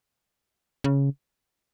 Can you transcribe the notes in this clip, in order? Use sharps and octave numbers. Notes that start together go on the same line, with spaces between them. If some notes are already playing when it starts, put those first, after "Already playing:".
C#3